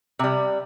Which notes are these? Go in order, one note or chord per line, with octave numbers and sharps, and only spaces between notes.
C3 G3